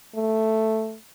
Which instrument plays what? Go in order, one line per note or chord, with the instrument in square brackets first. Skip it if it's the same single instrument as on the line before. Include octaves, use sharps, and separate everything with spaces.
[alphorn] A3